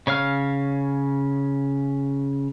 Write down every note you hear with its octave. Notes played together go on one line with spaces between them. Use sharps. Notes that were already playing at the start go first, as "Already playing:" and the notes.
C#3 C#5 F5 F6